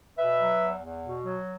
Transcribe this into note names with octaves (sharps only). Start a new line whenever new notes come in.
B2 B4 E5
F#3
E2
E2
B2
F#3